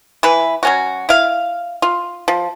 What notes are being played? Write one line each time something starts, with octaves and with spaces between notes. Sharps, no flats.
E3 B4
F#3 C#4 F#4
E4 F5
F4
F3